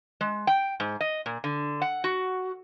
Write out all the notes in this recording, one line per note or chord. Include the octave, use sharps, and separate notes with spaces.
G#3
G5
G#2
D#5
A#2
D3
F#5
F#4